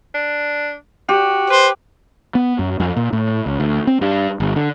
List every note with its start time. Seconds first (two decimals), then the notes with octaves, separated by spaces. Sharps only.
0.15 D4
1.09 F#4 G4
1.50 B4 C5
2.35 B3
2.59 F#2
2.80 F2
2.97 A#2
3.13 A2
3.46 C#2
3.60 D2
3.87 C4
4.01 G2
4.40 G1
4.56 D3